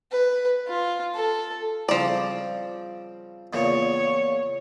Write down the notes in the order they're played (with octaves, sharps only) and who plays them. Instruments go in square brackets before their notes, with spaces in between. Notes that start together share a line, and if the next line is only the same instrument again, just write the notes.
[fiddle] B4
F4
A4
[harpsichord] C#3 G3 C4 [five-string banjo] F3 D5
[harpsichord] E2 A#2 C#3 [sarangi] C#5